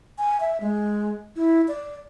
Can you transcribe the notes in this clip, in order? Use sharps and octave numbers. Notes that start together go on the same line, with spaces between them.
G#5
E5
G#3
E4
D5